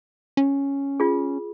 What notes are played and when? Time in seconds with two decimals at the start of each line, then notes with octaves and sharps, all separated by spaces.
0.37 C#4
1.00 F4 G#4